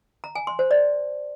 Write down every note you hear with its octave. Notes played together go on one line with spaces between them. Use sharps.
A#5
G#5
C6
C5
D5